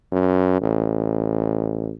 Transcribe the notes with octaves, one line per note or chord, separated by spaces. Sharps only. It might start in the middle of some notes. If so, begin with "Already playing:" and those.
F#2
A1